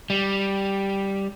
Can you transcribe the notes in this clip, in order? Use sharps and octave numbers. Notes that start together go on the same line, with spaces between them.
G3